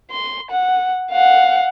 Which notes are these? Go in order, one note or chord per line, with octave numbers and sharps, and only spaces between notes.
C6
F#5
F5 F#5